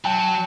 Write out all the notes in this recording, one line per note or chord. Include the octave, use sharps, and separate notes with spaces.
F#3 G5 A5